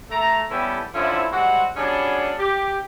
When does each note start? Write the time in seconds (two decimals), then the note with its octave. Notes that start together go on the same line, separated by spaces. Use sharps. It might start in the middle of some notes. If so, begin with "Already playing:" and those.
0.11 A3 A#5
0.51 G3 B3 C#4 E4 G4 A4
0.94 D3 F3 C4 C#4 E4
1.32 G3 G#3 C4 F#4
1.77 F#3 G3 B3 C#4 D4 G#4
2.39 G4